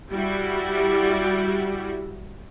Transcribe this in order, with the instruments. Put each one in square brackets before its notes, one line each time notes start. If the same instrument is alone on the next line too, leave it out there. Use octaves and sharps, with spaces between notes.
[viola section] G3 E4 F#4